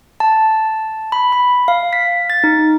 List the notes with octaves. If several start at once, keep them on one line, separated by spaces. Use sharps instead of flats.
A5
B5
B5
F5
B6
A6
D#4